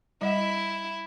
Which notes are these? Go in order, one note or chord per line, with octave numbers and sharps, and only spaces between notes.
G3 E4 D#5 F#5